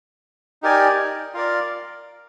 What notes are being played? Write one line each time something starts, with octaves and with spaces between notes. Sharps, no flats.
D#4 G4 A#4 D5 G#5
F4 A#4 D5